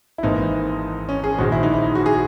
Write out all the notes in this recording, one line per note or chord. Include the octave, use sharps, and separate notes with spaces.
E4
G#1 G#2 E3 A#3 D#4
C#4
G#4
A#1 G#2 D#3 G#3 F#4
E4
D#4
E4
F#4
G#4